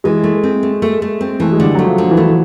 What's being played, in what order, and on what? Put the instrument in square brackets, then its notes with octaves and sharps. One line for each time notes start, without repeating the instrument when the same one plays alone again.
[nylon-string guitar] E3 [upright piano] G#3
[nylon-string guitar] A3
C4
A3
A3
A3
C4
[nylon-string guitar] E3 [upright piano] A3
[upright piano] G#3
[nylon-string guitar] D3 [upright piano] G3
[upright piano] F#3 [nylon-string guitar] A3
[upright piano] F3
[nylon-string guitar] D3
[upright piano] E3
[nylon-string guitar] A3